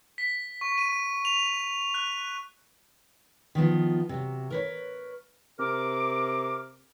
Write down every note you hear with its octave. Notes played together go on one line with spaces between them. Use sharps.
B6
C#6
D#7
F7
F#6
D#3 F3 B3 F4
C3 F#3
A#4 B4 C#5
C3 A#4 D6